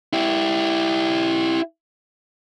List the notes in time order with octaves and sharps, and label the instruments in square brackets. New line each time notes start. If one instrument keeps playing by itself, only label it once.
[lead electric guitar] E4 G4